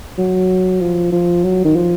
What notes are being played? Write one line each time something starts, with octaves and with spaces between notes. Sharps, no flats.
F#3
F3
F3
F#3
D#3
F3